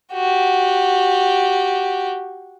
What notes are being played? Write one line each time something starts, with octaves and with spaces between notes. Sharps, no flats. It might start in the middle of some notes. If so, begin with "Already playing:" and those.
F#4 G4